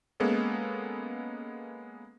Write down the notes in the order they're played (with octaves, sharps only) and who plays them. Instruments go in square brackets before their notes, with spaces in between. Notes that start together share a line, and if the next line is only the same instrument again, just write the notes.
[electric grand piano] G#3 A#3 B3 C#4 G#4 A4